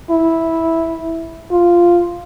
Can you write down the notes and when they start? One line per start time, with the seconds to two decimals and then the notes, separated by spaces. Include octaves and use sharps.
0.10 E4
1.51 F4